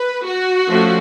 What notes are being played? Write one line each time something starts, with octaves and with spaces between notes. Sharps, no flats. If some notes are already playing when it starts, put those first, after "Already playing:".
Already playing: B4
F#4
F3 A3 C#4